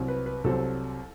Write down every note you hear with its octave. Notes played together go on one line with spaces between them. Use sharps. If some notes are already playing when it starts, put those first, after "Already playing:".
Already playing: C2 C3 F#3 C4
B4
B4
C2 C3 F#3 C4 A4